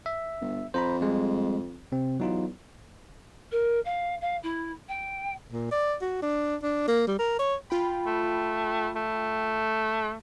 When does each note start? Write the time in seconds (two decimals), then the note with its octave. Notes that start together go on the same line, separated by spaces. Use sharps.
0.06 E5
0.41 G1
0.74 F2 C5 A#5 B5
1.01 G3 G#3 C4
1.92 C3 C4
2.20 E2 F#3 D#4 F4
3.52 A#4
3.85 F5
4.21 F5
4.43 E4
4.88 G5
5.51 A#2
5.71 D5
6.01 F#4
6.22 D4
6.63 D4
6.88 A#3
7.07 G3
7.19 A#4
7.39 C#5
7.70 F4 G5 B5
8.06 A3
8.95 A3